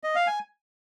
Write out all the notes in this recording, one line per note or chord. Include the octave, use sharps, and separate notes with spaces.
D#5
F5
G#5